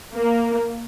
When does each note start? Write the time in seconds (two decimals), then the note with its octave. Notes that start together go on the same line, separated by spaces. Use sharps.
0.14 A#3